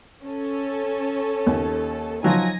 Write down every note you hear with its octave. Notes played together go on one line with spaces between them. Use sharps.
C#4 A4
D#2
F3 F#3 D#4 G#5 A#6